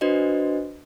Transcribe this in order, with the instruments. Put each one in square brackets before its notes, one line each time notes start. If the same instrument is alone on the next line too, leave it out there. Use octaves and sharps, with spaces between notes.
[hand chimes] D4 F#4 B4 C5 D#5